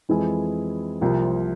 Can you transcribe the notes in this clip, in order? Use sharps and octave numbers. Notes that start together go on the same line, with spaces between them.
F2 E3 G#3 E4 G#4
C2 C3 F3 A#3